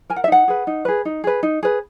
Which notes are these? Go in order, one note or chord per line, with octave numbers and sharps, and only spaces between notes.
A#4 G#5
F#5
E5
D#4 F#5
G#4 B4
D#4
G#4 B4
D#4
G#4 B4
D#4
G#4 B4